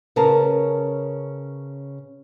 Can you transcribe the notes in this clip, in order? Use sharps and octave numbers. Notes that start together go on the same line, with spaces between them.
C#3 C#4 G#4 A#4 B4 A5